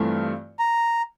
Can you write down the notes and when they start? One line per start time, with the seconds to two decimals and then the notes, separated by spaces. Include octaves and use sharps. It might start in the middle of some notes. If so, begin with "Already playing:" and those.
Already playing: G2 E3 A3 C4 F4
0.59 A#5